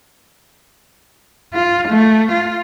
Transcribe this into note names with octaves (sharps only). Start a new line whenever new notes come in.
F4
A3
F4